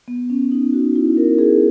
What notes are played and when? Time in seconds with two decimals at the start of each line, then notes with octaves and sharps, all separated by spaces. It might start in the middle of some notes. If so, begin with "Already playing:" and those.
0.08 B3
0.30 C#4
0.52 D#4
0.73 F#4
0.95 E4
1.17 A#4
1.38 G#4